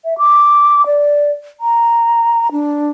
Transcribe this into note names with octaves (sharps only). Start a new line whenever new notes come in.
E5
D6
D5
A#5
D4